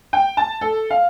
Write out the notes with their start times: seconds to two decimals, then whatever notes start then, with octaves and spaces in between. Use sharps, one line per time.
0.13 G5
0.37 A5
0.61 A4
0.90 F5